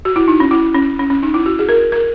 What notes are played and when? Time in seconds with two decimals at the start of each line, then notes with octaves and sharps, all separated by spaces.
0.05 F#4
0.16 E4
0.28 D#4
0.40 C#4
0.51 E4
0.75 C#4
0.99 C#4
1.10 C#4
1.23 D#4
1.34 E4
1.46 F#4
1.59 G#4
1.69 A#4
1.92 A#4